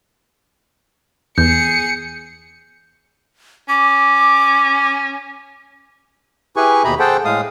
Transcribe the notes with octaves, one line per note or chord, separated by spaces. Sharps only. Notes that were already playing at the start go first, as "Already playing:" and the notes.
E2 G#4 G6 C#7
C#4 D6
E4 G4 G#4 B4 G#5 C#6
D#2 B2 G4 G#4 A#5 B5
G#4 A4 C5 F#5 G5 A5
A2 G#3 F5 D#6